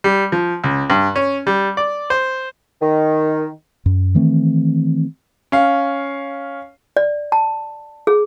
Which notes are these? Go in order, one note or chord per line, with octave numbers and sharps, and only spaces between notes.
G3
F3
C#2
G2
C#4
G3
D5
C5
D#3
F#2
D#3 E3 A3 C4
C#4 F5
D5
A5
G#4